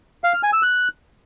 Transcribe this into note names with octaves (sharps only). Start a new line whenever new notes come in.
F5
F6
G#5
E6
F#6